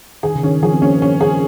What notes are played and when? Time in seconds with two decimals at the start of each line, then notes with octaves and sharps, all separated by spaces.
0.23 D#3 G#4
0.35 C#3
0.43 D#3 C#4
0.63 F3 G#4
0.73 C4
0.82 A#3 C#4
1.02 C#4
1.21 G#4